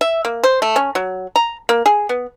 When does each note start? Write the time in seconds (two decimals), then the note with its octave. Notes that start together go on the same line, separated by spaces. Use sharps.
0.01 E5
0.25 A#3
0.44 C5
0.62 A3
0.76 C#4
0.95 F#3
1.36 A#5
1.69 A#3
1.86 G#4
2.09 B3